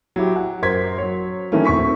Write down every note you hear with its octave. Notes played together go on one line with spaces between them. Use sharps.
F#3 E4 G4
F#5
F#2 A#4 C5 C6 G#6 B6
F#3 C#5
D#3 E3 F#3 A3 A#3 C#4
D2 C4 C#6 B6